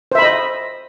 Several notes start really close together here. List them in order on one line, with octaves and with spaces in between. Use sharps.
C5 E5 B5 D#5